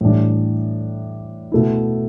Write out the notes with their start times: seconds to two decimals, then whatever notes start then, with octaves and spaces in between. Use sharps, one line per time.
0.01 A2 E3 G3 D4
1.52 B2 A3 E4